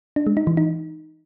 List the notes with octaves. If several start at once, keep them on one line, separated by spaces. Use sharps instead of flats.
D4
G#3
D#4
E3
D#4